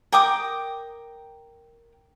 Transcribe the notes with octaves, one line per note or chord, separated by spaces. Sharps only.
A#4 G5 D6 D#6